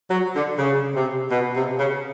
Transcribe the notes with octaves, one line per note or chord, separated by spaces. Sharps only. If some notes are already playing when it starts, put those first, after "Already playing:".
F#3
D3
C#3
C3
B2
C3
C#3